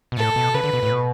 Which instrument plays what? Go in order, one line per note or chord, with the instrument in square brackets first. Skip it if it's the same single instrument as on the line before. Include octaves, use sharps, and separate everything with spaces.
[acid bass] B2
[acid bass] A2 [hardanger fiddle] A4
[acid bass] B2
[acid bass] C#3 [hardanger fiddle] B4
[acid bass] D3
B2
A2
B2